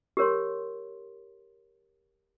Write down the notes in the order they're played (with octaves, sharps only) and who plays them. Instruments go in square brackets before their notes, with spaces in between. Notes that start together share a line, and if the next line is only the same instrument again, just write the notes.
[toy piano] G4 A#4 C#5 C6